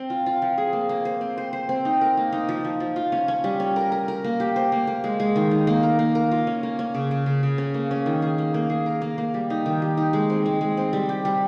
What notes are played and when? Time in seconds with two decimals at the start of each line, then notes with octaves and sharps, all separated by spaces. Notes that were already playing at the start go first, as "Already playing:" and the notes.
Already playing: C4
0.10 F4
0.26 F4
0.42 F3
0.58 G#4
0.73 A#3
0.89 A#3
1.05 C5
1.21 C4
1.38 C5
1.53 C5
1.69 C4
1.85 D#4
2.01 A#4
2.17 A#3
2.32 D#4
2.49 F3
2.65 F3
2.80 F3
2.96 F4
3.12 C#4
3.28 C#4
3.44 G3
3.60 C#4
3.76 A#4
3.92 A#4
4.08 A#4
4.24 A#3
4.40 G4
4.56 C5
4.72 A#3
4.87 A#3
5.04 G#3
5.20 G#3
5.36 D#3
5.51 D#4
5.67 A#3
5.83 A#4
5.99 A#3
6.15 A#4
6.32 F4
6.47 C#4
6.63 A#3
6.79 C#4
6.94 C#3
7.11 C#3
7.26 C#3
7.43 C#3
7.58 C#4
7.74 A#3
7.91 C#4
8.06 D#3
8.22 G#4
8.38 A#3
8.54 A#3
8.70 G#4
8.86 A#4
9.02 A#3
9.18 A#3
9.34 G3
9.50 D#4
9.66 D#3
9.82 G4
9.97 D#4
10.13 G#3
10.30 C4
10.46 G#3
10.61 G#3
10.77 C4
10.93 G3
11.09 G4
11.25 G3